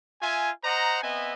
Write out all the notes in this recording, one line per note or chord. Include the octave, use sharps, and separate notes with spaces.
F4 E5 G#5
C5 D#5 F#5 A#5
B3 C4 D#5 E5 G#5